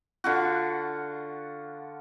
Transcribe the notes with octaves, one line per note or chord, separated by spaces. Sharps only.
D3 F4 F#4